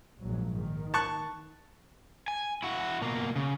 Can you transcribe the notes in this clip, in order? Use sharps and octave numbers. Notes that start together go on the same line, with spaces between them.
A#1 G#2 F#3
D#3
A5 C#6 F#6
G#5
E4 F#4
B2 A#3
C#3